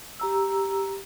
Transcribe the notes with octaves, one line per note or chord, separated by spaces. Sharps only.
G4 A#5 E6